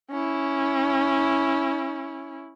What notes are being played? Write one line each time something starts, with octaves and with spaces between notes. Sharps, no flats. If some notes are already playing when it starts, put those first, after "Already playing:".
C#4 E4